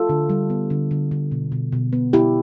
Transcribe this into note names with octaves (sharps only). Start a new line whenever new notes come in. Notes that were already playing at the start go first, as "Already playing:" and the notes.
Already playing: F4 A4
D3
G3
B3
D3
D3
D3
B2
B2
B2
B3
B3 E4 G4